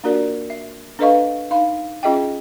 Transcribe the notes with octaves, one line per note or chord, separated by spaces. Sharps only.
A#3 D4 F4 F#4 A#4 D5
E5
D4 A4 B4 D#5 F5 C#6
D#4 F5 C6
C#4 F4 G#4 D#5 E5 G5